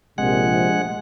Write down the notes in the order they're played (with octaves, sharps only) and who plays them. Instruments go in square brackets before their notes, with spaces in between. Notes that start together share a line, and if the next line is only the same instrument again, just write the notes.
[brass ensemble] A#1 C3 [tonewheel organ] G#3 F#5